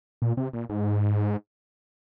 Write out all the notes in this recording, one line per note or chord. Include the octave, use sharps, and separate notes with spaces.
A#2
C3
A#2
G#2